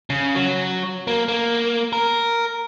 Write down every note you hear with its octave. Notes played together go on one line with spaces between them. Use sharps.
C#3
F#3
A#3
A#3
A#4